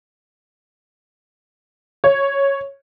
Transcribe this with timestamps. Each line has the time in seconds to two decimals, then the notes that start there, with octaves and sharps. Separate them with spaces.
2.04 C#5